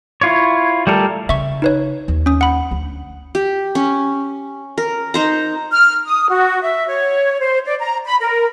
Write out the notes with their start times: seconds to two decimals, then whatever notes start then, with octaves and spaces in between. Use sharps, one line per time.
0.21 E4 F4 C#5
0.87 G3 A3 A4 A#4
1.29 C#3 E5 C#6
1.62 D#4 B4 C#5
2.08 D#2
2.26 C#4 D#6
2.41 F#5 B5
2.71 D2
3.35 G4
3.75 C#4
4.78 A#4
5.14 D#4 C5 A#5
5.72 F6
6.05 D#6
6.28 F#4
6.62 E5
6.87 C#5
7.40 C5
7.66 D5
7.80 A#5
8.06 B5
8.20 A#4